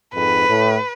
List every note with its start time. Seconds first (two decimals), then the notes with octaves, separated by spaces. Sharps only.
0.14 F2 G#2 B4
0.48 A2